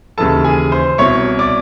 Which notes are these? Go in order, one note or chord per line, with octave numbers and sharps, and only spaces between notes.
D#2 C#3 E3 A4 A5
G#4 G#5
C5 C6
C2 B2 C#5 C#6
D5 D6